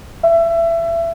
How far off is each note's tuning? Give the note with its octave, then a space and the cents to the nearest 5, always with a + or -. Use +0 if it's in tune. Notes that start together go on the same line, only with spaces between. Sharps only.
E5 +25